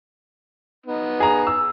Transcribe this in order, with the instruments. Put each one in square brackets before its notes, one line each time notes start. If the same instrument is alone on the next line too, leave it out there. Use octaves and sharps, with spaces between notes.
[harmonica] B3 D#4
[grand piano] G#4 A#5
E6